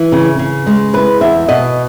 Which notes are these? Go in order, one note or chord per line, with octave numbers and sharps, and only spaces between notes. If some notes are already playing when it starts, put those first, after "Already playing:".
Already playing: E3
C#3
C#3
G#3
E4 B4
E2 E5
B2 D#5